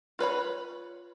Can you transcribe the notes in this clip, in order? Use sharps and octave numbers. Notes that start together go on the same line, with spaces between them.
F4 B4 C#5 B5